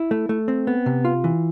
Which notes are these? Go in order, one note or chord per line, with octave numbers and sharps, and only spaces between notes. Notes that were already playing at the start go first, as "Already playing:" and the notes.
Already playing: E4
A3
A3
C4
B3
C3
F4
E3